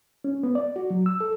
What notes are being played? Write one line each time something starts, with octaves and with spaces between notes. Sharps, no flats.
C#4
B3
D5
F#4
F#3
E6
A4